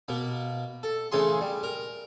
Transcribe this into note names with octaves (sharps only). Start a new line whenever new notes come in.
B2 A#3
A4
C#3 E3 A3 G#4 C6
G3
A#4